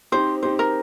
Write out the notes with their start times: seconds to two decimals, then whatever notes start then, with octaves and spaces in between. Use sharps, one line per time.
0.12 C4 D#4 G4 C5
0.43 C4 D#4 G4 C5
0.59 A#4